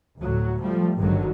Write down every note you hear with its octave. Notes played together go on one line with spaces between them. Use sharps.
D2 A2 F#3
F3 G3 A3
G#1 G2 D3 D#3 F#3